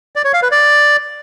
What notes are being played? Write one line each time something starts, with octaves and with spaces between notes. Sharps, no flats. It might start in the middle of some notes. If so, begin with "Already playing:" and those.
D5
C#5
F5
B4
D5